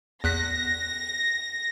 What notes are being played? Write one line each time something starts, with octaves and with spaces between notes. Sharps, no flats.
E2 F#6 A#6 B6